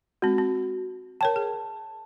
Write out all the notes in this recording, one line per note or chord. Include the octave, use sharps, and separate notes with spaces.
G#3 C4 F#4
C4
A#4 C#5 G5 A5
G#4